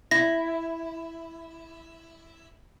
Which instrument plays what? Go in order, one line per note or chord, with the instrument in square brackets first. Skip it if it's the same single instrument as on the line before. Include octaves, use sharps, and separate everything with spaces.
[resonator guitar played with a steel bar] E4 [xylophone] A#6